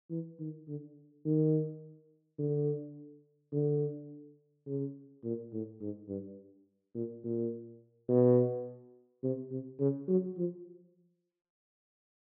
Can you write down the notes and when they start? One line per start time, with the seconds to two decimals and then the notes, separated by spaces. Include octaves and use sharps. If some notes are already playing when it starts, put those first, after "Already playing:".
0.11 E3
0.40 D#3
0.68 D3
1.26 D#3
2.39 D3
3.53 D3
4.67 C#3
5.24 A#2
5.53 A2
5.81 G#2
6.09 G2
6.95 A#2
7.24 A#2
8.09 B2
9.24 C3
9.52 C3
9.80 C#3
10.08 F#3
10.37 F3